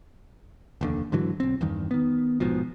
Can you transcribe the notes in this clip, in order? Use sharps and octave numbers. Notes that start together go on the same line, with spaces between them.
F1 D#2 D3
G#2 D3 E3 F#3
B1 C4
E2 G2 D#3
D#3 B3
A#1 G#2 B2 F3